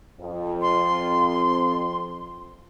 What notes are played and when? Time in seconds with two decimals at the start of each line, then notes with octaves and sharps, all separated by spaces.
0.20 F2
0.62 C6